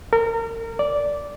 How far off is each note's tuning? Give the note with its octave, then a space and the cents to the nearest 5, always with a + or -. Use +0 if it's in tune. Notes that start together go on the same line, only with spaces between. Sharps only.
A#4 -30
D5 -10